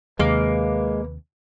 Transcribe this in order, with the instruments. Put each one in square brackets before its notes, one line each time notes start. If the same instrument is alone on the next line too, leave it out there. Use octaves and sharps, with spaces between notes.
[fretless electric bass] D#2 C3 [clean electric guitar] G#3 [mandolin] A#3 D6 [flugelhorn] B4